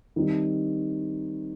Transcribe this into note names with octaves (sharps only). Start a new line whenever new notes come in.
D#3 G3 C4